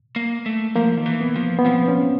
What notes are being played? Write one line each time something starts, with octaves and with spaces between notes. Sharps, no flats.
A#3
A3
F3 A#3
D#3
E3
B3
F3
B3
F3 C4
C#4